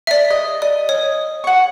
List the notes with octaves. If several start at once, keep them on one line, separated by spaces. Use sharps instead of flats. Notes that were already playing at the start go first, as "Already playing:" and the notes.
D5 E5
D#5
D5 D#5
C#5
F#5 C#6